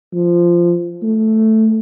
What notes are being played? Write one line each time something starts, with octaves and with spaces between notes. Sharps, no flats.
F3
A3